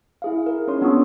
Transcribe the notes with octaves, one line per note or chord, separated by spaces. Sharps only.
E4 G#4 F5
A#4
C#4 D#4 C#5 C6
B3 D4 F4 G#4 C#6 D#6